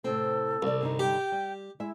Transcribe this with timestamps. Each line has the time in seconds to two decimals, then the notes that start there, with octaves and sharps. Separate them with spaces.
0.04 A2 C3 C4 A4
0.62 C2 D5 F5
0.81 G2 D3 D#4
0.99 G4 G5
1.32 G3
1.80 G#3 E4 E5